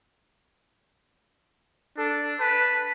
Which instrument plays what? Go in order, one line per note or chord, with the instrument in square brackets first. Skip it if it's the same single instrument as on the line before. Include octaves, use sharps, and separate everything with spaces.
[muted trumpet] D4 [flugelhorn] A4
[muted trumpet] B4 [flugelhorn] A5